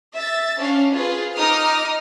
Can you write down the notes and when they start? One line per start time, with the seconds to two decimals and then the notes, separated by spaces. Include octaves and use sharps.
0.14 E5 A6
0.58 C#4 D4 F5
0.93 F4 G#4 B4
1.34 D#4 D6 D#6 F6